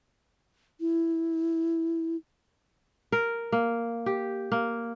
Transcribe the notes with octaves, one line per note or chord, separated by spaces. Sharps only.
E4
A#4
A#3
G4
A#3